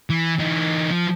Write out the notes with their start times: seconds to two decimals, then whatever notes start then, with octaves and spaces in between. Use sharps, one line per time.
0.10 E3
0.39 E3 D#4
0.91 F3